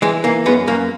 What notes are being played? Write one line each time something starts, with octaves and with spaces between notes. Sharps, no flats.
E3 G#3
E3 A#3
F#2 G#3 B3
F#2 A#3 C#4